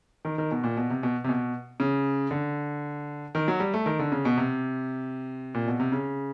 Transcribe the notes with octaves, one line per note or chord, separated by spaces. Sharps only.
D#3
D#3
B2
A#2
B2
C3
B2
C3
B2
C#3
D3
D#3
F#3
G3
A3
D#3
D3
C#3
B2
C3
A#2
B2
C3
C#3